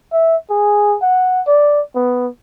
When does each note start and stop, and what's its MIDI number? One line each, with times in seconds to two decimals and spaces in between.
0.13 0.36 76
0.50 0.97 68
1.03 1.42 78
1.47 1.81 74
1.95 2.28 59